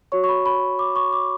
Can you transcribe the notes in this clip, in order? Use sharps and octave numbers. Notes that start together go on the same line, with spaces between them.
F#4 C#5 C#6
C#6
B5
B5
D6
C#6
D6